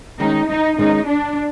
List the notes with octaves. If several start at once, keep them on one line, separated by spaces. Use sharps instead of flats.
D#3 G#3 C#4 D#4
D#4
D#3 G#3 C#4 D#4
D4